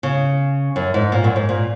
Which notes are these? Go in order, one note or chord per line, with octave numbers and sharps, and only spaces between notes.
C#3
F#2
G#2
A#2
F#2
G#2
A#2